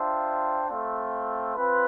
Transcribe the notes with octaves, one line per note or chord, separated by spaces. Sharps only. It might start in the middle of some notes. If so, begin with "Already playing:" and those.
Already playing: D4 F4 C5 E5 G5
A3 C4 F4
C4 F4 B4